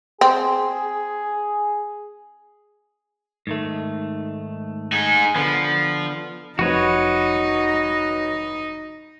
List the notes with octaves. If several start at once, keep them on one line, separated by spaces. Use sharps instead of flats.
C4 G#4
G#2 D#3 A3
D#4 G#4
D3 F3 B3
F1 F3 D#4 F#4 B4 C#5